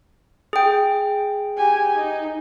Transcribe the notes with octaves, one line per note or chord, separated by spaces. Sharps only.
G#4 G5
G4 G#5
D#4